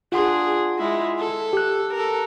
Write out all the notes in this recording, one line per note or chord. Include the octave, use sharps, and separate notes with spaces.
D4 F4 G#4 F#5 C6
G#3 E4
A4
G4 F#6
A4 A#4